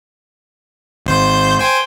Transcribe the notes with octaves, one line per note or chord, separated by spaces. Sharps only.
G#1 C5 G6
C5 G5 G#5